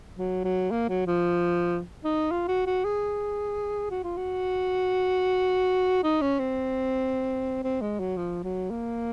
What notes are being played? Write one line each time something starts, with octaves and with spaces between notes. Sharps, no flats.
F#3
F#3
A#3
F#3
F3
D#4
F4
F#4
F#4
G#4
F#4
F4
F#4
D#4
C#4
C4
C4
G#3
F#3
F3
F#3
A#3